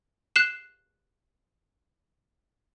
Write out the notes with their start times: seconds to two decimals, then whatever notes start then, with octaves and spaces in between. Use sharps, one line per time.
0.36 F#6 C7 E7